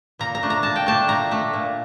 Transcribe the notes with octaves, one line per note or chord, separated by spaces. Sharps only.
A#2 A#5
A#5
A3 D4
A#5
A#2 A5
G5
A3 D4 A5
A#2 A#5
A3 D4
A#2